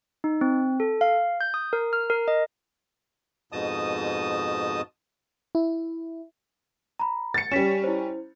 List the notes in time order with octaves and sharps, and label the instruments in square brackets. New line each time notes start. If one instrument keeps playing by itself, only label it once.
[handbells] D#4
C4
A4
F5
G6
D#6
A#4
F6
A#4
D#5
[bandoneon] F2 G#2 B2 D#5 A5 D#6
[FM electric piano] E4
[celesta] A#5 B5
[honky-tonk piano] A6 C#7
[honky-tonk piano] G3 C#4 [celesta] B6 E7
[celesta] E4 C5